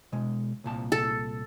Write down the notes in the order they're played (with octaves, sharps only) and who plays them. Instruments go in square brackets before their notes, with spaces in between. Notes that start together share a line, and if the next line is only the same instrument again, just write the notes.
[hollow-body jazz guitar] B2 G#3
C2 A#2 A5
[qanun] A4